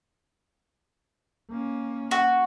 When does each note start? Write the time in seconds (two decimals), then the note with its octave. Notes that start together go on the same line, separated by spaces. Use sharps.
1.50 A#3 C#4
2.11 F#4